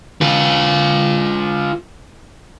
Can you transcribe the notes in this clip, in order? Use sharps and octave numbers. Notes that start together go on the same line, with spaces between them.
F4 B4